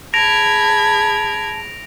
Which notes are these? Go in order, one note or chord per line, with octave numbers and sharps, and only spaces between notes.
G#4 A5 B5 G#6 A#6 D7 F7